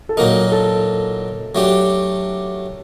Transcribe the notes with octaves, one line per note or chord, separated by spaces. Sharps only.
A4
A#2 F#3 A#3 D#4 A#4
A4
F#3 A3 D4 G4